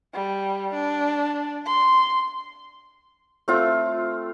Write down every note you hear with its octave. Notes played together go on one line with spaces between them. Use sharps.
G3
D4
C6
A3 C4 F4